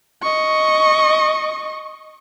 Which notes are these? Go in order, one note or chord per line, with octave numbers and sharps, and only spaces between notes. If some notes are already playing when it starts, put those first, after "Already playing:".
D#5 C#6